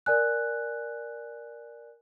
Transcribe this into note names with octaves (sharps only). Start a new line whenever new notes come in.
A#4 D5 G#5 F#6